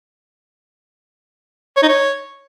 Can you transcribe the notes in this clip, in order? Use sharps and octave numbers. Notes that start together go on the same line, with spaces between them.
C#5
D#4
C#5